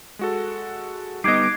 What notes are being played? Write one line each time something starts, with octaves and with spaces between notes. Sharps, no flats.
G#3 F#4 A4
G3 B3 D#4 D#5 D6 F#6 G#6 C7